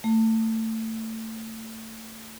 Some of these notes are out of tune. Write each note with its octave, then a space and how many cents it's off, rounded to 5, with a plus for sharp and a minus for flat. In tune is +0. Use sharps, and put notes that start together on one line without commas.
A3 +25